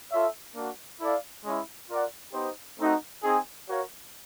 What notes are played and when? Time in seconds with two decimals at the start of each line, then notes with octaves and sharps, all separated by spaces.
0.12 F4 A4 C#5 E5
0.55 A#3 D4 F#4
1.00 E4 A4 D5 F5
1.44 G#3 C#4 E4
1.90 F4 A#4 D5 F#5
2.34 B3 D#4 G4 C5
2.79 A3 C4 D#4 F#4
3.24 C4 D#4 G#4
3.68 F#4 A#4 C#5 F5